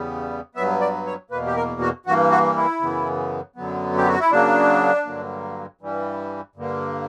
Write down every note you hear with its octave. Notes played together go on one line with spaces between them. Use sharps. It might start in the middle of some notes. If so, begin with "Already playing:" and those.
Already playing: E2 C#3 G3 B3
G2 F#3 B3 E5
D5
C#5
E2 B2 A#3 B4
G4
A#4
F#4
G2 E3 A#3 F#4
F#4
E4
F#2 C#3 E3 B3
F#2 D3 F#3 B3
G4
F#4
E4
C#3 F#3 A#3 D4
G2 D3 F#3 A#3
G2 E3 G3
G2 D3 A#3